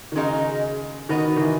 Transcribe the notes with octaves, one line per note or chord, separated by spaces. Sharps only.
D#3
C#3 G#3 D#4 F#4 A#4
D#3 B3 F#4 B4 D#5
D#3
E3